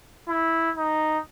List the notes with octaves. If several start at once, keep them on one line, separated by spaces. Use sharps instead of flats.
E4
D#4